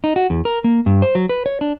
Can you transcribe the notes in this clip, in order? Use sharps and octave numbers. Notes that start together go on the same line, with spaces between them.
D#4
F#4
E2
A#4
A#3
G2
C5
F#3
B4
C#5
D4